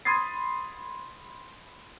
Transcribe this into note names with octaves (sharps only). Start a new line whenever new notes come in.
B5 C6 D#6 G#6 A6 C7